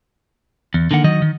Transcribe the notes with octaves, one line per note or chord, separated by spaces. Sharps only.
E2
D3 D#3 A#3 F#5
D#3 F#3 D#5
D#3